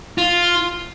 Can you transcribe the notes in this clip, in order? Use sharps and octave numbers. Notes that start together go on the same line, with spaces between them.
F4